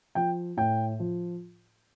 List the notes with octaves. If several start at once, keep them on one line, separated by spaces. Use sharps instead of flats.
F3 G5
A2 G5
F3